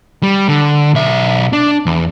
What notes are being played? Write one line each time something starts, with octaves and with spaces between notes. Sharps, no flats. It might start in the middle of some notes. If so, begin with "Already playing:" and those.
G3
D3
B1 E5
D4
E2